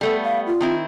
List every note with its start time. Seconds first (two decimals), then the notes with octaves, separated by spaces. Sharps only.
0.01 G3 A3 B3 A4
0.23 F5
0.47 F4
0.61 D#3 C4 E4